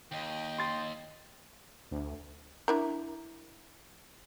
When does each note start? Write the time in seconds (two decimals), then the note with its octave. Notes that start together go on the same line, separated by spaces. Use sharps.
0.12 D#2 D#5 G5
0.58 C6 A6
1.91 D2
2.68 D4 E4 A#4